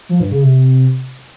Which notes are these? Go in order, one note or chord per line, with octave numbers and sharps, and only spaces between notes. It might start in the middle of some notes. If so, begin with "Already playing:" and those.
F3
G2
C#3
C3